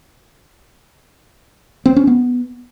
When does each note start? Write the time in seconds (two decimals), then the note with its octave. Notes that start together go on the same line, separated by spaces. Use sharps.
1.86 C4
1.96 C#4
2.07 B3